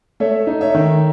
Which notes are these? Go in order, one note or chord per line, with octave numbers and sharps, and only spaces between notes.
A3 C#5 E5
D#4
C#5 E5
D#3